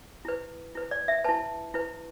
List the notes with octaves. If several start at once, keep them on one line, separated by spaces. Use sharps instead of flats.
E4 B4
E4 B4
D5
E5
E4 B4 A5
E4 B4